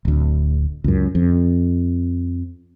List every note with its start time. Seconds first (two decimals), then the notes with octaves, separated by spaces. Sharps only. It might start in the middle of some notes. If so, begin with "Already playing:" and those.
0.05 D1 D2
0.84 C#2 F#2
1.15 F2